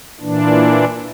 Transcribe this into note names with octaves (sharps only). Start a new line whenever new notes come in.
A#2 E3 D4